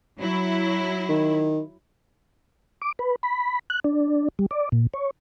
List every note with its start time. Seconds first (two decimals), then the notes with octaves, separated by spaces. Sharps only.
0.20 F#3 E4
1.09 D#3
2.82 D6
2.99 B4
3.23 B5
3.70 F#6
3.84 D4
4.39 G3
4.51 D5
4.72 A#2
4.94 C#5